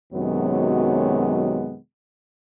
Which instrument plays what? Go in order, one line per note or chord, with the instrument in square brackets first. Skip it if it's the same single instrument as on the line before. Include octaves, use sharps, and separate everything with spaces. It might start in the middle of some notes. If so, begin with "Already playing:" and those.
[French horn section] F#2 C3 D#3 F#3 G#3 B3